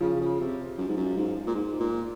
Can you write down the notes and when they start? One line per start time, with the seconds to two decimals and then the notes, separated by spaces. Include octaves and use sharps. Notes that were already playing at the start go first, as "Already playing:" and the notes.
0.01 C#3 F3
0.21 C#3
0.40 C3
0.77 F#2
0.88 G#2
0.97 F#2
1.16 G#2
1.47 A#2
1.54 G#2
1.79 A#2